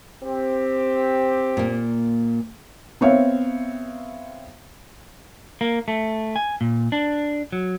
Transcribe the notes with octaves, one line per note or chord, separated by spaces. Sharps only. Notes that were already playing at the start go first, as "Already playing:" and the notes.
C4 G4
A#2 A#3
B3 C4 C#5 E5 F5
A#3
A3
G#5
A#2
D4
F#3